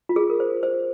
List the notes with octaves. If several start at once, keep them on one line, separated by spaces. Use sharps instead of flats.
F4
G#4
A#4
C5
C5